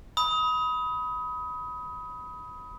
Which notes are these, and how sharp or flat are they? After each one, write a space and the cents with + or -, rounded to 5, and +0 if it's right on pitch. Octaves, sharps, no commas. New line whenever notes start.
B5 +0 D#6 +25